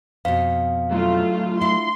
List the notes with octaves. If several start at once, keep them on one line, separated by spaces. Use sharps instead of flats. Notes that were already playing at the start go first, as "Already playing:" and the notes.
F2 B2 F5
A2 F#3 A3 F4
D4 E4 F4 C6